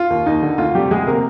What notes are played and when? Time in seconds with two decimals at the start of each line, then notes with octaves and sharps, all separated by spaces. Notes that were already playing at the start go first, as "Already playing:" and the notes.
Already playing: F4
0.10 D#2
0.26 D#2 D#4
0.42 D3
0.58 D2 F4
0.74 C3 G3 G4
0.90 D2 G#3 G#4
1.07 C3 A#3 A#4